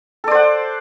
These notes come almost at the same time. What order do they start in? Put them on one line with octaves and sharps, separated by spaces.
A4 D5 C5 F#5